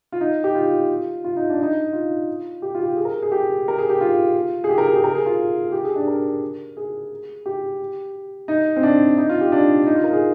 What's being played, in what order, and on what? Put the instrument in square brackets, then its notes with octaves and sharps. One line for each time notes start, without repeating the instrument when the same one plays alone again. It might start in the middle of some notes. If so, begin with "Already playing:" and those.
[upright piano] F4
D#4
G4
F4
F4
D#4
D4
D#4
F4
G4
F4
G4
G#4
A#4
G#4
G4
A#4
G#4
G4
F4
G#4
G4
A#4
G#4
G4
A#4
G#4
F4
G4
G#4
D4
A#4
G#4
G4
D#4
C4
D4
D#4
F4
G4
D4
D#4
F4
A#4
G#4